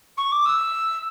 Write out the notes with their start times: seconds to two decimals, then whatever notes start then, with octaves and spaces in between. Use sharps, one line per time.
0.17 C#6
0.31 D6
0.45 E6